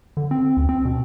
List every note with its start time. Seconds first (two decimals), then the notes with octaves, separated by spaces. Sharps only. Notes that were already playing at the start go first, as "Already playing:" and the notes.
0.17 D3
0.31 C4
0.57 D2
0.69 C4
0.85 B2